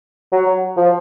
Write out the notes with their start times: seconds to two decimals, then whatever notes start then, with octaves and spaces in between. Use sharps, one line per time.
0.33 F#3
0.77 F3